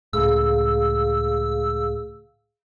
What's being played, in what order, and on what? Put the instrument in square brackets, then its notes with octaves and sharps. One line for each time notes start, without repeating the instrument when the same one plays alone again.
[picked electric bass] C#2 A2 [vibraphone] G#4 F5 [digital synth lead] E6